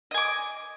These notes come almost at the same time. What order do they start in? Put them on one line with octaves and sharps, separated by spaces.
D#5 G#5 D6